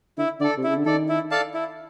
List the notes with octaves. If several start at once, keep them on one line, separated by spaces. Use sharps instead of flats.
D3 E4
D3 A4 D5
C3
C#3 E4
D3
D#3 A4 D5
E4
A4 D5 F5 A5
E4